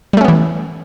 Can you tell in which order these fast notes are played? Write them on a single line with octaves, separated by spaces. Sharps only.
G3 A3 C#4 B3 E3